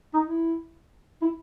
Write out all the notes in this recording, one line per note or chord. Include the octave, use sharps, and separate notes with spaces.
D#4
E4
E4